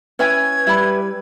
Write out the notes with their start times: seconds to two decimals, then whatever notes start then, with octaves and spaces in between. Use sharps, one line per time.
0.19 C#4 E4 B4 G#5 G#6
0.67 G3 E4 B5